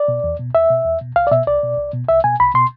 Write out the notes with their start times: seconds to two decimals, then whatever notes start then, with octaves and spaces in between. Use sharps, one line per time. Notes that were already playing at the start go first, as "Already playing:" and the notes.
Already playing: D5
0.08 B2
0.24 E2
0.39 B2
0.54 E2 E5
0.70 B2
0.86 E2
1.01 B2
1.16 C2 F5
1.27 D5
1.31 B2 E5
1.47 C2 D5
1.63 B2
1.78 C2
1.93 B2
2.09 C2 E5
2.24 B2 G#5
2.40 C2 B5
2.54 B2 C6